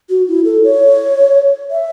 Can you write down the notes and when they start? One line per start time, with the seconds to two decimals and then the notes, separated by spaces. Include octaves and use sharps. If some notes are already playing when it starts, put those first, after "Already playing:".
0.09 F#4
0.28 E4
0.45 A4
0.64 C#5
1.71 E5